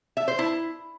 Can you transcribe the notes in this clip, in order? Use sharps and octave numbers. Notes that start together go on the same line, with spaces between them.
E5
C5
E4